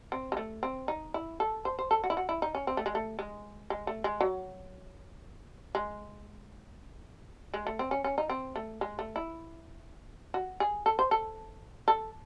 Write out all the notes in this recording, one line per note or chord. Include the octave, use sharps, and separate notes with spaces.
C4
G#3
A3
C4
D#4
E4
A4
C5
C5
A4
F#4
E4
F#4
E4
D#4
C#4
C4
A3
G#3
A3
G#3
G#3
A3
G#3
F#3
G#3
G#3
A3
C4
C#4
C#4
D#4
C4
A3
G#3
A3
E4
F#4
G#4
A4
C5
A4
A4